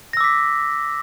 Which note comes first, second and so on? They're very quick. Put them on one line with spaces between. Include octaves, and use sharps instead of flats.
A#6 E6 D6 B6